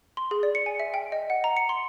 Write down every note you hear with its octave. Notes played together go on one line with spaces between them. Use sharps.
C6
G#4
D5
C#7
G#5
E5
G5
D#5
F#5
A#5
C#7
C6